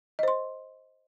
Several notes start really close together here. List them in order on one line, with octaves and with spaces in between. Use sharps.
D#5 C5 C6